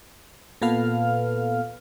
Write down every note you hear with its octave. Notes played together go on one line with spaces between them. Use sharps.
A#2 B3 A4 B4 F5 F6